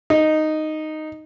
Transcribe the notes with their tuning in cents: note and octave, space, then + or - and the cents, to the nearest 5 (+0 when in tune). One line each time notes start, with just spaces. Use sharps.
D#4 -5